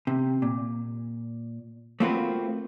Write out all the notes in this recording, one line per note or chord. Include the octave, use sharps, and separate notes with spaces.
C3
A#2
A3 A#3 C4 F4 F#4 B4